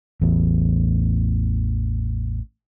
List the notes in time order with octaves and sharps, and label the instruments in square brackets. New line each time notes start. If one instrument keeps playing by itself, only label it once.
[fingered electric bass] A1 E2